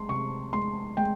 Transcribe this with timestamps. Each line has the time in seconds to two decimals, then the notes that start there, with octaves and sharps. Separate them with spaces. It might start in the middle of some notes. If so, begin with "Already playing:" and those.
Already playing: G#3 C6
0.09 C3 C#6
0.53 G#3 C6
0.97 G#3 G5